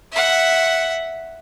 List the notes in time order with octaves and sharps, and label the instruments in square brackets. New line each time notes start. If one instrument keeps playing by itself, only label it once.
[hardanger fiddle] E5 F#5